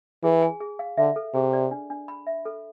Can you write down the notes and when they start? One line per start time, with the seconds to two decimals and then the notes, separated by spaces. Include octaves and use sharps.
0.24 E3 G#4
0.42 G#5
0.61 G#4
0.79 F5
0.97 D3 E5
1.16 A4
1.34 C3 G#4
1.53 D5
1.71 D4
1.90 D4
2.08 B5
2.27 E5
2.45 A4